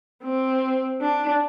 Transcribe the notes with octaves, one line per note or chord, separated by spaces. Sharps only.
C4
D4